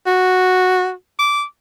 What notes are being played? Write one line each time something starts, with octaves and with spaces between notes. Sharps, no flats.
F#4
D6